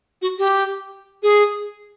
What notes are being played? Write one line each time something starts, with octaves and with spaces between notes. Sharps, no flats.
F#4
G4
G#4